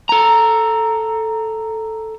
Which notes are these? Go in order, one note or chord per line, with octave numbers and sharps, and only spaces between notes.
A4 A#5